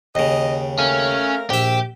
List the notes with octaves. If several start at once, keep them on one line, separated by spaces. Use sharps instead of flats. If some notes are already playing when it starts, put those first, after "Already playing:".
D#2 C#3 D#5
A3 C#4 A#4 F5
A#1 G4 E5